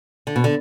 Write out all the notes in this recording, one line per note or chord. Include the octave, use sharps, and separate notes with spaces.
D3
B2
D3